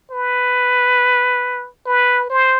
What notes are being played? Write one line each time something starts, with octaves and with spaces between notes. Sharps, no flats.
B4
B4
C5